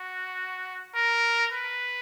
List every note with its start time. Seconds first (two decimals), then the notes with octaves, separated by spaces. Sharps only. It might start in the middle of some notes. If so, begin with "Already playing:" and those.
Already playing: F#4
0.95 A#4
1.52 B4